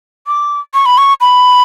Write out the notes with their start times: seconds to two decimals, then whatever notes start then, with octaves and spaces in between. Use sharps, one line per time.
0.27 D6
0.74 C#6
0.86 B5
0.98 C#6
1.21 B5